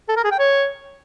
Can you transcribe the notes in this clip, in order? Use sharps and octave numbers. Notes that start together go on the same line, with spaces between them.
A4
A#4
G#4
G5
C#5